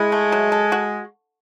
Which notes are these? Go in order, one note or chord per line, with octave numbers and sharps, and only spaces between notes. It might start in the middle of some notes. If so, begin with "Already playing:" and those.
Already playing: G#3 E4
A3
F#3
A4
F#4